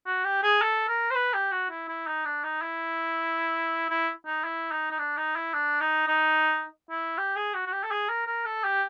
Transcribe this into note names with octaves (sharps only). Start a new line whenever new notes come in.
F#4
G4
G#4
A4
A#4
C5
B4
G4
F#4
E4
E4
D#4
D4
D#4
E4
E4
D#4
E4
D#4
D#4
D4
D#4
E4
D4
D#4
D#4
E4
G4
G#4
F#4
F#4
G4
A4
G#4
A#4
A#4
A4
G4